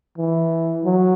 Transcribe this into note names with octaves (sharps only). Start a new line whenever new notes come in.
E3
F#3